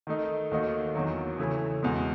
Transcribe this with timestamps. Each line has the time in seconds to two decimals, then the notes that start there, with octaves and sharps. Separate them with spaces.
0.07 D#3 A3 D#4
0.51 D#2 D#3 A3 D#4 F#4
0.95 E2 D#3 F#3
1.38 C#3 E3 A3 E4
1.83 E2 B2 G#3